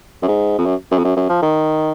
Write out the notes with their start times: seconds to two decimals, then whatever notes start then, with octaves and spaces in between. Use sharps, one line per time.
0.22 F#2
0.28 G#2
0.58 F2
0.66 F#2
0.91 F#2
0.98 F2
1.04 F#2
1.16 F#2
1.29 F3
1.42 D#3